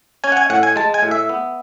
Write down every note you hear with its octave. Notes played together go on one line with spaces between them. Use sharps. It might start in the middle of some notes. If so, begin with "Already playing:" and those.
C#4 G#5
F#5
G#5
A2 F#5
G#5
G#3 A5
G#5
A2
E5
B3